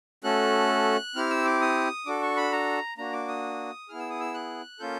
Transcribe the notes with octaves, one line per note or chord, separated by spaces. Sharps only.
A3 C#4 F#4 A4 F#6
C4 E4 G4 F6
E6
D6
D#6
D4 F#4 A4 D6
C#6
B5
A#5
A#3 D4 F#4 A#5
D6
D#6
B3 E4 G#4 F6
E6
D#6
E6
F#6
A#3 C#4 F4 A4 G6